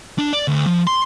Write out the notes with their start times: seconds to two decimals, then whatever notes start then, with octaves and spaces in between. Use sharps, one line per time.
0.18 D4
0.33 D5
0.48 D2
0.67 F3
0.87 C6